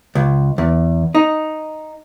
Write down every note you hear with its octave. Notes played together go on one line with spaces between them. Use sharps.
C#2
E2
D#4